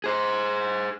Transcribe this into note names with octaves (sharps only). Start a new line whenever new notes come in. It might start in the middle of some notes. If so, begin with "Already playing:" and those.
G#4 C5